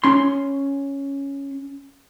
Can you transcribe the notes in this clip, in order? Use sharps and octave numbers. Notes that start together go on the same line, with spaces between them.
C#4 C6